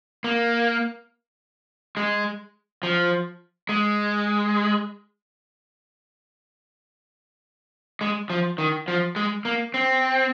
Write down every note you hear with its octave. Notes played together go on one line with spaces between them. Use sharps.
A#3
G#3
F3
G#3
G#3
F3
D#3
F3
G#3
A#3
C4